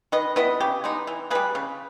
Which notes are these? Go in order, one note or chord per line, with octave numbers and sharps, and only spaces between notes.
D#3 B4 D#5
G3 B3 E4 B4 D#5
C#3 G4
G#3 B3 D#4
E3
G3 A#3 G#4 B4
C#3